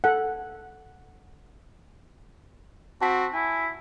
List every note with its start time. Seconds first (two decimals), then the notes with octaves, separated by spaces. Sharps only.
0.04 A4 F#5
3.01 C4 F#4 A5 B6
3.34 E4 G#5